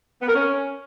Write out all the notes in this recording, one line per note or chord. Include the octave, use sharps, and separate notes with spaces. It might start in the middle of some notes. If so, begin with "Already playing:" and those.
B3
A#4
C#4